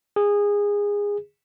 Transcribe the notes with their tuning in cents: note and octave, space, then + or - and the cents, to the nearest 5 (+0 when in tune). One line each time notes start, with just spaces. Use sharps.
G#4 -20